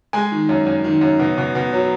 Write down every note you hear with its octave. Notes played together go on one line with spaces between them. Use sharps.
G#3 G#5
D#3
F#2
F#2
D#3
F#2
B2
B2
B2
F#3